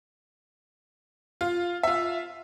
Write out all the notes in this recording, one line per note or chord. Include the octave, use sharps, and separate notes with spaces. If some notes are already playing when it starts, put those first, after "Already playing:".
F4
F4 E5